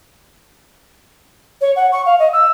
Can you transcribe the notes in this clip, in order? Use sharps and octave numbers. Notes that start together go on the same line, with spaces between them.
C#5
F#5
C#6
F5
D#5
E6